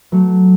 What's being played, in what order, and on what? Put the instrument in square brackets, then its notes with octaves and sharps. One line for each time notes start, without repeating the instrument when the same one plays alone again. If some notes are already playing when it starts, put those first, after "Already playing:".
[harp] F#3 A3